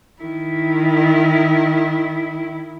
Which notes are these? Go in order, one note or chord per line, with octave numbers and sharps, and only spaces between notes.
D#3 E4